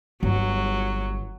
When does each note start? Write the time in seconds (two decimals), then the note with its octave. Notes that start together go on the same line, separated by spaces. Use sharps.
0.23 G1 F#3